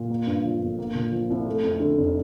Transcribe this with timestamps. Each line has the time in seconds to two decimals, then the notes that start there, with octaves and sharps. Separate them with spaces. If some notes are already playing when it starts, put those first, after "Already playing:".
Already playing: A#2
0.10 A#3
0.27 G2
0.45 F3
0.61 G1
0.79 A#3
0.95 A#2
1.12 F3
1.30 C2
1.46 A3
1.64 F2
1.80 D3
1.98 F1